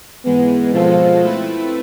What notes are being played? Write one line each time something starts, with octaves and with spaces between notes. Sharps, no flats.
G#2 E3 G#3 B3
B2 F3 G#3 C4 F4 A4
A3 C4 E4 B4